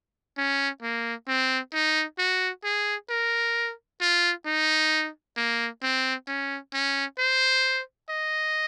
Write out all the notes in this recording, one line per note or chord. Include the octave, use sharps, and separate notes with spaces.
C#4
A#3
C4
D#4
F#4
G#4
A#4
F4
D#4
A#3
C4
C#4
C#4
C5
D#5